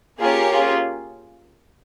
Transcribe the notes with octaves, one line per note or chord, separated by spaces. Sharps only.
A#3 C#4 F4 G4 G#4 A#4 C#5
F4 G#4